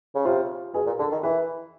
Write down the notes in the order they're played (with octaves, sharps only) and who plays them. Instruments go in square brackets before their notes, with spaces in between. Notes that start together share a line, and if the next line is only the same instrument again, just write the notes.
[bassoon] C#3
[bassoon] C3 [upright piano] F4
[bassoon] B2 [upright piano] G#4
[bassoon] A#2
[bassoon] D3 [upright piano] A4
[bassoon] D#3
[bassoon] E3 [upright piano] B4